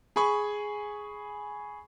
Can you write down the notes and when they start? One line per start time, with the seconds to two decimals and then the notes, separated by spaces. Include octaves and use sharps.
0.16 G#4 G#5 B5 C#6